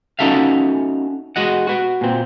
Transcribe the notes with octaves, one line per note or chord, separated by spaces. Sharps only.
C#4 D#4 F#4 A4 E5 F5
G#3 F#4 D#5 F#5
F#4 B4
A#2 C4